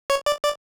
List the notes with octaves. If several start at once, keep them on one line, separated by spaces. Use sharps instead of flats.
C#5
D5
D5